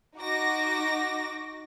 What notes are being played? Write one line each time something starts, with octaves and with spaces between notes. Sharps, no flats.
D#4 F#4 D6 A#6